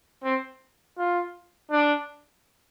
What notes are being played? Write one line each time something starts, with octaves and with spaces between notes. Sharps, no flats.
C4
F4
D4